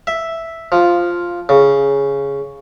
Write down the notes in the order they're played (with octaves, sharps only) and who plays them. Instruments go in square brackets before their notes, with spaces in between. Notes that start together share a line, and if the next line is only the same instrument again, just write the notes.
[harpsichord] E5
F3
C#3